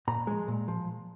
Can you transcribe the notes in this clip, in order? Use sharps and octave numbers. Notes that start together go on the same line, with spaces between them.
A#2 A#5
F3 G#3
A#2
F3